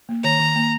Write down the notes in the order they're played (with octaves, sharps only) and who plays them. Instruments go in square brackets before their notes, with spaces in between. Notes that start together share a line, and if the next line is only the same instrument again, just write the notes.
[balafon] A#3
[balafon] D#3 [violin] A#5
[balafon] D#3
A#3